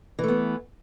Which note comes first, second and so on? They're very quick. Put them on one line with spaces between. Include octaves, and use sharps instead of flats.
E3 A3 B3